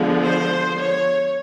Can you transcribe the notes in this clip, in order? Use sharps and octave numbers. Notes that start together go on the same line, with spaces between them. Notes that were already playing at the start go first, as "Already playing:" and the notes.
Already playing: D3 F3 G#3 B3
C5
C#5